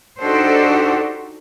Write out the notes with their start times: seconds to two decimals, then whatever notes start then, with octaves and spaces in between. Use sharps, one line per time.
0.19 D4 D#4 F#4 G4 A4 C5